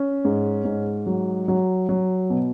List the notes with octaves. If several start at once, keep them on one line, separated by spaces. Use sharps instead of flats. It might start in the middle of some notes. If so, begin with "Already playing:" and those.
Already playing: C#4
G#2
G#2
F#3
F#3
F#3
B2